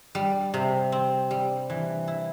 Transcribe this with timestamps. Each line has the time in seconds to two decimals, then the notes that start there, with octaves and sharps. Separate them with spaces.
0.15 G3
0.54 C3
0.92 C4
1.31 G3
1.70 E3
2.08 E4